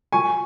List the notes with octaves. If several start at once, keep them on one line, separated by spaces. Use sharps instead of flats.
G#5 C#6